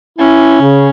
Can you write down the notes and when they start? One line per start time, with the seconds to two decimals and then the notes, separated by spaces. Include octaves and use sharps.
0.19 C#4 E4
0.61 C#3